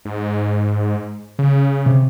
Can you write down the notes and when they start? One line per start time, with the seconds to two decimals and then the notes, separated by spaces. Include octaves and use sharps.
0.05 G#2
1.39 C#3
1.86 C3